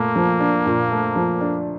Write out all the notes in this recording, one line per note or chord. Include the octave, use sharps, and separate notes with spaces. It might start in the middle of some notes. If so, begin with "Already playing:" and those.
Already playing: A#2 A3 A#3
F3
D4
A#2
A3
F3
D4